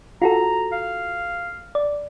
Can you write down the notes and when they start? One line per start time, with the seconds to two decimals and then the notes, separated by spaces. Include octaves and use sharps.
0.22 F4 F#4 A4 A#5
0.72 F5
1.75 D5